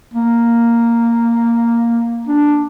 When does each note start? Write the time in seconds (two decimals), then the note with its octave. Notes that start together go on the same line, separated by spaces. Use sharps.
0.14 A#3
2.27 D4